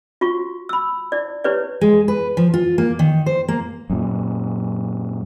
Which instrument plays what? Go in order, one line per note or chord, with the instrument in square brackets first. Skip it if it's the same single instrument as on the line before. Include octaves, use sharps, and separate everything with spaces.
[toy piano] F4 F#4 C#6
B5 E6
E4 D5
E4 G4 B4 C#5 D5
[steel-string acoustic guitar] G#3
B4
F3
F4
A#3
D#3
C5
A#3
[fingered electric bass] F#2 A#2